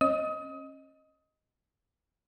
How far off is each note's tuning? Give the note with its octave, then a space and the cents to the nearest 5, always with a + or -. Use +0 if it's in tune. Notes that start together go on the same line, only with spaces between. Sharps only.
C#4 -35 D#5 +0 D#6 +25